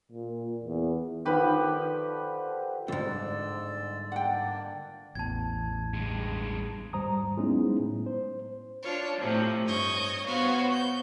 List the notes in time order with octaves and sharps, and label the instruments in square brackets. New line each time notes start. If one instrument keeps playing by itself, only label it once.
[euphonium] A#2
E2
[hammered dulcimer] D3 F3 G4 [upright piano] D#3 B4
[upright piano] G1 [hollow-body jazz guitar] C#2 G#2 [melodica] G#3 D5 E6
[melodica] A#3 D4 D5 [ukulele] F#5 G5
[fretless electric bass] A1 E2 [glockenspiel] A5 G#6
[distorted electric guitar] G2 G#3
[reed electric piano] D#2 G#2 G3 C5 A#5 D#6
F#3 G#3 B3 C#4 D#4 E4
A2
C5
[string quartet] D4 F4 C#5
A2 C3 F3
G2 C#5 D#5 G6
B3 F#4 C5 C#5 F5
G6